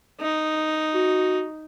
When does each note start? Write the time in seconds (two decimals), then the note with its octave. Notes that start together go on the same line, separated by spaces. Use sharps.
0.21 D#4
0.95 F#4